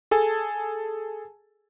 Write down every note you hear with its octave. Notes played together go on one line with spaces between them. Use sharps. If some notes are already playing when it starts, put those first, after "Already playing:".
G#4 A4 G#5 A5